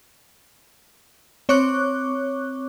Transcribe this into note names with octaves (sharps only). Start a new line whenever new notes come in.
C4 C#5 C#6 D6 F#6